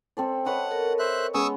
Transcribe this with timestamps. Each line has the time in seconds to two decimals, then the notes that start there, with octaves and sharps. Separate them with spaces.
0.17 C4 A4 D5
0.46 B4 C#5 D#5 F#5
0.71 A4 A#4
0.99 C5 E5 F#6
1.34 G#3 B3 C#4 C#6 D#6 E6